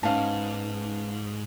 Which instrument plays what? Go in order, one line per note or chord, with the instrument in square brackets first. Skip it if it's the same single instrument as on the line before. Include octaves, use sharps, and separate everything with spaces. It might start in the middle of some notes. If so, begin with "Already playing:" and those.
[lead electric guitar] G#2 [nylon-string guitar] B3 C#4 D#4 [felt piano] F5 A5